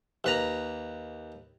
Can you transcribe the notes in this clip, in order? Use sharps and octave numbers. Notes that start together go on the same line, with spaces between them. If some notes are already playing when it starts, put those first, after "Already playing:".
D#2 B4 A#5